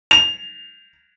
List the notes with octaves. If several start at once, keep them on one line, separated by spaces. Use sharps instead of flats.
F7